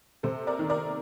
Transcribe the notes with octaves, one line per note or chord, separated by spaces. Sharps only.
C3 A4 C5
A#4 D5
D#3
A#4 D5